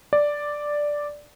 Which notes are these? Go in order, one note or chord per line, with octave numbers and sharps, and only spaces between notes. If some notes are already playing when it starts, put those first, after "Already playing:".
D5